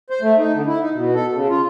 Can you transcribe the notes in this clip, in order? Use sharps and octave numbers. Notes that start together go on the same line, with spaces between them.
C5
A3
D#4
D3
E4
D#4
B2
A4
C#3
F4